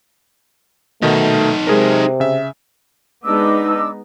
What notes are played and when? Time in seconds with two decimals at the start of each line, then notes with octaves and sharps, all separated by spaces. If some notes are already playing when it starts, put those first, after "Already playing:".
1.02 B2 D#3 A3 D#4 A4
1.67 C3 G#3 G#4 A#4
2.20 C#3 E5
3.24 G#3 B3 D4 D#4 D6 E6